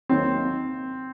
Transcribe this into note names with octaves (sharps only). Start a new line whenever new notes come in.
D#2 D#3 F#3 C4